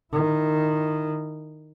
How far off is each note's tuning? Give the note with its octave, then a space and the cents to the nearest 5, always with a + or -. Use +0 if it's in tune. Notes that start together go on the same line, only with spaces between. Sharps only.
D#3 -15 E4 +0